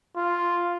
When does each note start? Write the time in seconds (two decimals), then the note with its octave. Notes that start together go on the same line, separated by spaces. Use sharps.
0.16 F4